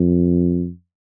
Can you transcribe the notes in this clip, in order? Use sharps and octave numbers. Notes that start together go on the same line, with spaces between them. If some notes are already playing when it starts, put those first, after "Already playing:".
Already playing: F2